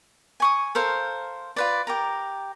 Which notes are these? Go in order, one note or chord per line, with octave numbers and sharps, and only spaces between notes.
G#5 C#6 D#6
A4 A#4 C5 F5
F4 B4 D5
G4 A#4 A#5